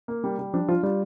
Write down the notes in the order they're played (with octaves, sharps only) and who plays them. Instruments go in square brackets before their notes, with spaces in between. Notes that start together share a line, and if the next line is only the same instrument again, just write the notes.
[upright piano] A#3
G3
G3
[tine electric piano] F3 [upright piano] D4
[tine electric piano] F3 [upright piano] F4
[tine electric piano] G3 [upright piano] F4